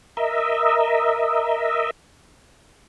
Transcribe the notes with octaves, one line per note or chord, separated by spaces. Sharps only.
A#4 D#5 E5